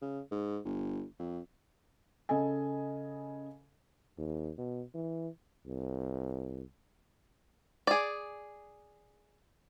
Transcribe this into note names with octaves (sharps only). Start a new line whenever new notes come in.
C#3
G#2
G1
F2
C#3 A4 D#5 G#5
D#2
B2
E3
C2
G#4 D5